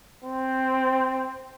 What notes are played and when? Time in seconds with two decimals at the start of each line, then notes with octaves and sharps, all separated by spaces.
0.24 C4